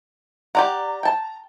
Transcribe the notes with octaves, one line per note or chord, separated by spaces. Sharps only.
G4 D5 F#5 A#5
G5 A5